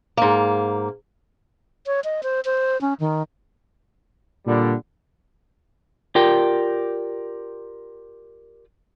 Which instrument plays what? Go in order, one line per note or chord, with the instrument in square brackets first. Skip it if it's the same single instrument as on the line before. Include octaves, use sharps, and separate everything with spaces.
[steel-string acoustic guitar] G#2 A#3
[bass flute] C#5
D#5
C5
C5
C#4
D#3
[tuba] A#2 [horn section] D3 G3
[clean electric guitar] F4 G4 A#4 D5 G5